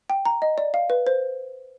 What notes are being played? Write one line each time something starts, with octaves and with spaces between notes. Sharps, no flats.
G5
A#5
D#5
D5
F5
B4
C5